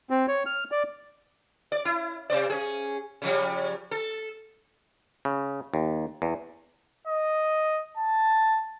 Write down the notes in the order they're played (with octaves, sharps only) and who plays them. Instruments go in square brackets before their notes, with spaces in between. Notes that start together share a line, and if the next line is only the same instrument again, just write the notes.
[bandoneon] C4
C#5
F6
D5
[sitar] D5
E4
C3 C5 D5
C#4 G#4
C#3 F3 G3
A4
[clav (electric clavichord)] C#3
D#2
E2
[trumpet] D#5
A5